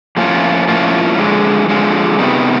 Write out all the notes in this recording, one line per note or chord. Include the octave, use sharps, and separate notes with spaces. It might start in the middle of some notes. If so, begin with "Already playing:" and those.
A2 F3 A#3 C#4 F4
A2 F3 A#3 C#4 F4
D3 F3 G#3
D3 F3 G#3
C3 D#3 G3 B3